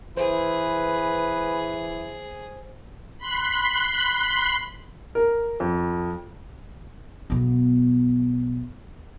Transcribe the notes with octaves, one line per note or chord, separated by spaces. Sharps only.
E3 G#4 B4 C5
B5 C6 F#6
A#4
F2
B1 B3